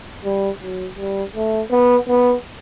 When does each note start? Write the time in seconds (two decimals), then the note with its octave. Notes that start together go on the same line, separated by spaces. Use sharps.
0.25 G3
0.62 F#3
0.98 G3
1.36 A3
1.71 B3
2.09 B3